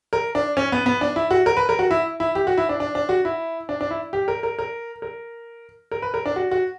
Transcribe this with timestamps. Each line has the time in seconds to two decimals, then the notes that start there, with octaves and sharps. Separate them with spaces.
0.13 A#4
0.35 D4
0.57 C#4
0.72 B3
0.86 B3
1.01 D4
1.16 E4
1.31 F#4
1.46 A#4
1.57 B4
1.69 A#4
1.79 F#4
1.91 E4
2.20 E4
2.35 G4
2.47 F#4
2.58 E4
2.69 D4
2.80 D4
2.95 D4
3.09 F#4
3.25 E4
3.69 D4
3.81 D4
3.91 E4
4.13 G4
4.28 A#4
4.43 A#4
4.59 A#4
5.02 A#4
5.91 A#4
6.02 B4
6.14 A#4
6.26 D4
6.36 F#4
6.51 F#4